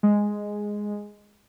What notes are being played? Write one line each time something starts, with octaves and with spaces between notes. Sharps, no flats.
G#3